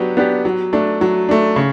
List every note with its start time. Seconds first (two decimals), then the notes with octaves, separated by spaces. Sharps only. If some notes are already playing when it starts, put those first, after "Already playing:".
Already playing: F#3 B3 D4 G4
0.17 B3 D4 G4
0.45 F#3
0.73 A3 D4
1.01 F#3
1.29 A3 D4
1.56 C#3